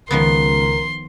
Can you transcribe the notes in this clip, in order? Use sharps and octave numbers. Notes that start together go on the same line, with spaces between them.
C#2 D#3 F3 B3 A#4 C6